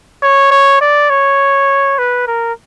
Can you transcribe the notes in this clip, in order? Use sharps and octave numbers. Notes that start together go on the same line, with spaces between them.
C#5
C#5
D5
C#5
B4
A#4